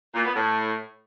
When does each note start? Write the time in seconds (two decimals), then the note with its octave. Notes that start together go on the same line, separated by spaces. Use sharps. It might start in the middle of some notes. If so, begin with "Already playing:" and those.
0.14 A#2
0.25 B3
0.35 A2